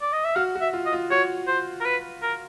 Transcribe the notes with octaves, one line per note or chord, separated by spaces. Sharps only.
D5
D#5
E5
F#4 F5
F#4
E5
F4
D#5
F4
F#4 C#5
C5
A#4
B4
A#4